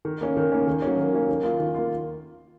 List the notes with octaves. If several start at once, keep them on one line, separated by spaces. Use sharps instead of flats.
D#3
A#3 C#4
D#3
A#3 C#4
D#3
F#3 A#3 C#4
D#3
F#3 A#3 C#4
D#3
A#3 F4
D#3
A#3 F4